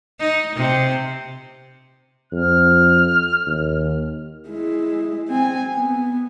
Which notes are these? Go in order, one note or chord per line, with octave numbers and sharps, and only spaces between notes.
D#4
C3
F2 F6
D#2
G#3 E4
C4 G#5
B3